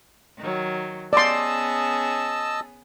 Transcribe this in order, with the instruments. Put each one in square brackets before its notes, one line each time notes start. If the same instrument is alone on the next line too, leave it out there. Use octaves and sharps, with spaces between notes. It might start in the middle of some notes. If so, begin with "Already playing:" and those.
[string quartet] D#3 F#3
[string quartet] B3 C#4 G#4 [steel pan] D5 C6 [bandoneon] D#5 A5 E6